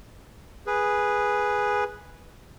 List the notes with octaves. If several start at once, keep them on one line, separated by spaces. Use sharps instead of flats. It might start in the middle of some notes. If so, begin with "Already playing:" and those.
G#4 B4